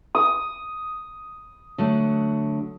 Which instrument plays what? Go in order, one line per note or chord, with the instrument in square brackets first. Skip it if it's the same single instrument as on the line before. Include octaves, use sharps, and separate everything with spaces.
[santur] D#6
[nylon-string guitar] D3 F#3 A3